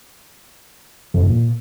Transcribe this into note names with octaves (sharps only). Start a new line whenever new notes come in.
F2
G2
A#2